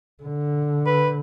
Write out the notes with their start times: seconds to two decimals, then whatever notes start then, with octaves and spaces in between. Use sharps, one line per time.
0.23 D3
0.86 B4